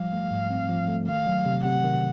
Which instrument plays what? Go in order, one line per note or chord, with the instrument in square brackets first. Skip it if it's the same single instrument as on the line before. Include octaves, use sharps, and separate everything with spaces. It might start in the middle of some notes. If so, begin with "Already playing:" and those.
Already playing: [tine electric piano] F3 G3 [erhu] F5
[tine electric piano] A3
G#2
C4
F3
A3
[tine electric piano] D#3 [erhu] F5
[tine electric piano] F#3
C3
[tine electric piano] C3 [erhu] F#5
[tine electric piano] D#3